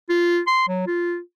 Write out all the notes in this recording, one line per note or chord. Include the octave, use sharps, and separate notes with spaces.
F4
C6
F#3
F4